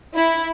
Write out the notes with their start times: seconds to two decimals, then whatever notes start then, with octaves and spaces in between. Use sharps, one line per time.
0.15 E4